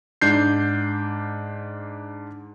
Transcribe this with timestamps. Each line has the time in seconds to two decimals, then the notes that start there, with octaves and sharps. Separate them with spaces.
0.21 G#2 D4 G6 C7